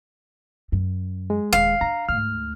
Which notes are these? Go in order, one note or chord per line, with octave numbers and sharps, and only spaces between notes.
F#2
G#3
D#1 D#3 F5
D4 A#5
D2 G#2 F6